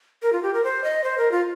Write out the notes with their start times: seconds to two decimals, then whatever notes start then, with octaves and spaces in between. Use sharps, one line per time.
0.22 A#4
0.33 F4
0.43 G4
0.54 A#4
0.64 C5
0.84 D#5
1.04 C5
1.18 A#4
1.32 F4